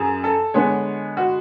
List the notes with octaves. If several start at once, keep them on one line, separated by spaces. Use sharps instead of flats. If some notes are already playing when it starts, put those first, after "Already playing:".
Already playing: F#2 G#4
A4
D3 G#3 B3 C#5
F#4